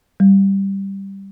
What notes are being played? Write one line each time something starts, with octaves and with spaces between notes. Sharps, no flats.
G3